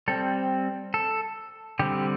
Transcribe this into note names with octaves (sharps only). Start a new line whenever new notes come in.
G3 C4 A4
A4
D3 G3 C4 G4